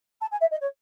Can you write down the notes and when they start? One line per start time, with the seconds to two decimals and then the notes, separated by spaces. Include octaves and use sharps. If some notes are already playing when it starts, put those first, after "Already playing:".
0.21 A5
0.31 G#5
0.41 E5
0.51 D#5
0.61 C#5